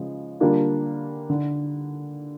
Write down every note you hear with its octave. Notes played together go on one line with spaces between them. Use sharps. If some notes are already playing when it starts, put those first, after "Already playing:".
Already playing: C#3 F3 G#3
D3 G3 A#3 D4 F4
D3